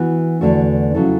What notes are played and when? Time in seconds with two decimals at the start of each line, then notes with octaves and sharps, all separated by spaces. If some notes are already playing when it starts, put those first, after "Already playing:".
Already playing: E3 B3 F#4
0.41 E2 D3 A3 D4 F#4
0.94 C#3 F#3 C#4 E4 A4